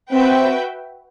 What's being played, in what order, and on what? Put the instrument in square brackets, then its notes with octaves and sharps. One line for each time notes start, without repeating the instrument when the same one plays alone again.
[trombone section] C4 [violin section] F#4 B4 E5 G5